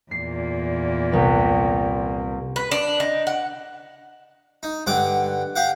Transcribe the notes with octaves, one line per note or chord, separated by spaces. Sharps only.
E2 A#2 C7
C2 B4
B4
D4
D#4
F#5
D#4
G2 D3 F#5 D6
G4 F5 F#5